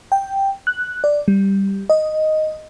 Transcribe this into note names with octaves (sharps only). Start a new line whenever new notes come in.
G5
F#6
D5
G3
D#5